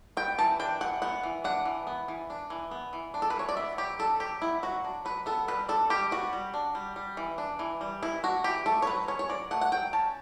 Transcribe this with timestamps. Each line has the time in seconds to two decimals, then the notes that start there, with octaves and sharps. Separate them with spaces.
0.17 B3 G5
0.39 E3 A5
0.60 D4 G5
0.81 E3 F#5
1.02 B3 F#5
1.23 E3
1.44 D4 F#5
1.65 E3
1.87 B3
2.08 E3
2.30 D4
2.50 E3
2.71 B3
2.93 E3
3.14 D4
3.22 A4
3.30 B4
3.35 E3 C#5
3.49 D5
3.57 B3 E5
3.78 F#3 G4
3.99 D4 A4
4.20 F#3 G4
4.42 B3 E4
4.63 F#3 F#4
4.84 D4
5.05 F#3 B4
5.26 B3 A4
5.48 G3 B4
5.69 D4 A4
5.90 G3 G4
6.11 B3 F#4
6.33 G3
6.54 D4
6.75 G3
6.96 G3
7.17 E3
7.38 D4
7.59 E3
7.81 G3
8.03 E3 E4
8.23 D4 F#4
8.44 E3 G4
8.66 A3 A4
8.82 C#5
8.87 F#3 B4
9.08 C#4 C#5
9.19 C#5
9.29 F#3 D5
9.51 A3 F#5
9.61 F#5
9.72 F#3 G5
9.93 C#4 A5